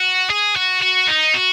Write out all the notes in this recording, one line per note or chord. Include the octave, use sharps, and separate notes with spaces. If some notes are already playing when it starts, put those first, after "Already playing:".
Already playing: F#4
G#4
F#4
F#4
D#4
F#4